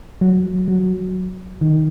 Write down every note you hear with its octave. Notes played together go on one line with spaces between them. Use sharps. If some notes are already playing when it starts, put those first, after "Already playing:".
F#3
F#3
D#3